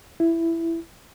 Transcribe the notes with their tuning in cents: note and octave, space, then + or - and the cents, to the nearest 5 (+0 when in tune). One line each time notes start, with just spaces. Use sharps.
E4 +10